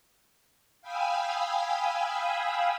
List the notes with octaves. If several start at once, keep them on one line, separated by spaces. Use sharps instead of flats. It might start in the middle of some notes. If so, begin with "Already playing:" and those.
F5 G5 G#5 B5 D#6 E6